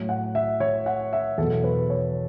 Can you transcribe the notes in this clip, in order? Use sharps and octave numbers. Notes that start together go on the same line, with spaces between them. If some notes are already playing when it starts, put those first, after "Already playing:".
Already playing: A2 F#3
F#5
E5
C#5
F#5
E5
E2 B2 F#3 A4
B4
C#5